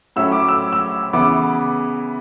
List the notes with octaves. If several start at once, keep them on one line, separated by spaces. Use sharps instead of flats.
A2 F#3 A3 C#4 E4 E6
D6
E6
E6
C#3 E3 B3 E4 D6